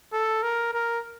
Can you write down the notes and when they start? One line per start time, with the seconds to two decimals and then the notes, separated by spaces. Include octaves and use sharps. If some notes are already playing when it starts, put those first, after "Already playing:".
0.13 A4
0.43 A#4
0.73 A#4